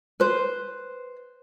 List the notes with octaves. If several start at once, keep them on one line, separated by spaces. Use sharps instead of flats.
B4 C5